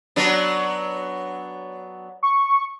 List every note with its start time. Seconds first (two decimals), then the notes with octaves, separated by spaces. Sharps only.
0.16 F#3 B3 D4
2.23 C#6